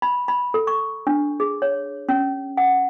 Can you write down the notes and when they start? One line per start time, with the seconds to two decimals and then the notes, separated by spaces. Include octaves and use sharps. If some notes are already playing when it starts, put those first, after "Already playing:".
0.02 B5
0.28 B5
0.54 A4
0.67 C#6
1.07 D4
1.40 G#4
1.62 C#5
2.09 C#4
2.57 F#5